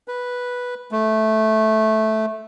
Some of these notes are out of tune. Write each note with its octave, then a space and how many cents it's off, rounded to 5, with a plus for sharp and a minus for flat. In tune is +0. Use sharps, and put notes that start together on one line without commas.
B4 -5
A3 -10